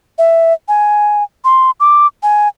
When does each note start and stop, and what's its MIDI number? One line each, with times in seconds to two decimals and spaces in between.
0.18 0.53 76
0.68 1.23 80
1.45 1.71 84
1.80 2.07 86
2.23 2.48 80